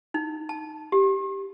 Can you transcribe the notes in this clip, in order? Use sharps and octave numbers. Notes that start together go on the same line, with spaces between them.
D#4
A5
G4